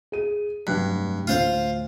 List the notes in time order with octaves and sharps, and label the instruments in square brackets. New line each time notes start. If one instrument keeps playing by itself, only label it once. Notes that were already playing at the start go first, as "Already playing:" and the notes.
[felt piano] G#4 D#7
[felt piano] F1 F#3 F#6 [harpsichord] G2
[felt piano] D2 A2 D3 [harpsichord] F4 C5 F5